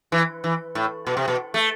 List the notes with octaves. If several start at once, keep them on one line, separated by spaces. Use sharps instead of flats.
E3
E3
A2
B2
C3
B2
A3